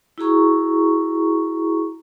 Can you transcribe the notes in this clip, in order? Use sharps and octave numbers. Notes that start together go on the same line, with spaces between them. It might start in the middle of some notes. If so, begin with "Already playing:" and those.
E4 F#4 G#4 A#5 C#6